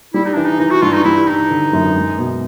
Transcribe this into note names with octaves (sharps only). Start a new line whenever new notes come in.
G3 E4
D#4
E3 D4
D#4
E3 D#4
F#4
G2 F4
D#4
G3 E4
E3 D#4
D3
F#2
G#3
B2